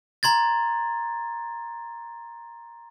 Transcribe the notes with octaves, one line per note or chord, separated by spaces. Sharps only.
A#5 C6 G#6 A6